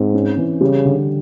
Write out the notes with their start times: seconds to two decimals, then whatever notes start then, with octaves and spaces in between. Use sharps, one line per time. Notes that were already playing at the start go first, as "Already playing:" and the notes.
Already playing: G#2 C4
0.14 C#4
0.37 E3
0.61 C#3 G3
0.85 D3